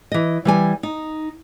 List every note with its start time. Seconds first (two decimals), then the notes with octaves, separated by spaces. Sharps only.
0.12 E3 D#5
0.45 E3 G3 G#5
0.83 D#4